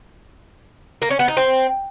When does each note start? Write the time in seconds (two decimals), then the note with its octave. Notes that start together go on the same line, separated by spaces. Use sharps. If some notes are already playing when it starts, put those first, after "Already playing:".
1.02 A#3
1.10 C#4
1.19 B3
1.28 D#4
1.37 C4